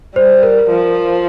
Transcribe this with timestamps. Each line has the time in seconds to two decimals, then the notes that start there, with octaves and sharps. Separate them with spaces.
0.16 G3 C5
0.43 A#4
0.70 F3